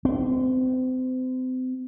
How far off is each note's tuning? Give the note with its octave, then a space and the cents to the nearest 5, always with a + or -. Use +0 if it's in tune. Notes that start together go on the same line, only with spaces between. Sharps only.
C4 -35